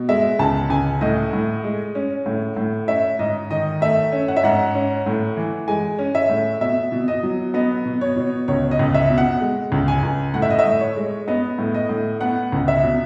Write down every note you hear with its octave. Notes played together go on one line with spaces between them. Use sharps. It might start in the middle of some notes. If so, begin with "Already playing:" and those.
Already playing: B2
G#3 E5
C#2 A5
C#2 G#5
A2 D#5
A2
G#3
C#4
A2
A2
C#4 E5
G#2 D#5
D#3 D#5
A3 E5
C#4
F#5
E5
G#2 F#5
C#4
A2
E3
G#3 G#5
C#4
E5
A2
B2 E5
B2
D#5
F#3
B3 D#5
B2
C#5
B2
C#2 C#5
D#5
C#2
E5
B2
F#5
G#3
C#2
G#5
C#2
A2 F#5
E5
D#5
E5
A2
C#5
G#3
B3 D#5
A2
D#5
A2
B3 F#5
C#2
E5
B2